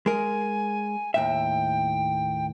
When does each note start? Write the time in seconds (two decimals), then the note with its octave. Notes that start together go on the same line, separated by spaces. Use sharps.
0.06 G#3 A#4 G#5
1.14 D#2 A2 E5 G5